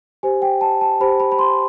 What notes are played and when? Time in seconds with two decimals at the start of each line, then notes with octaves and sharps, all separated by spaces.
0.23 G4 C5 G#5
0.42 G5
0.61 A5
0.81 A5
1.00 G4 C5 B5
1.20 B5
1.32 B5
1.39 C6